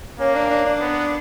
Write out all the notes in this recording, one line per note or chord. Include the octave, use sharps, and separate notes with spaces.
A#3 C#4
D4
D4
D4
B3